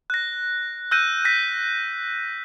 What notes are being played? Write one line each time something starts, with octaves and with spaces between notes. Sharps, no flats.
F#6 A#6
E6 F#6 G6 A#6 D#7
F#6 A#6 B6